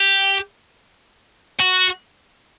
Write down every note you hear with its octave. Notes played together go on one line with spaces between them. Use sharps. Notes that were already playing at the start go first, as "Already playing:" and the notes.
Already playing: G4
F#4